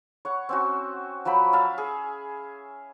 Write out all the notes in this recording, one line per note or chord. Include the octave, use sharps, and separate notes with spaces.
C#5 F#5
C4 C#4 F#4
F3 F#3 G5 B5
E5 F5 A5
G#4